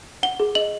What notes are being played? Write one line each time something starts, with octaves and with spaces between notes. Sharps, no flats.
F#5 G7
G#4
D#5 F#7